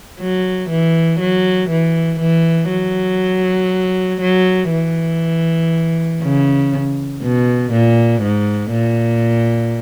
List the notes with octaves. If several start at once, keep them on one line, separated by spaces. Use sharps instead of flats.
F#3
E3
F#3
E3
E3
F#3
F#3
E3
C#3
B2
A#2
G#2
A#2